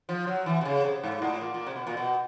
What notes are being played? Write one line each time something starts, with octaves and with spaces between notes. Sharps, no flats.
F3
F#3
E3
C3
C#3
C3
G#2
A2
A#2
A#2
C3
B2
A#2
B2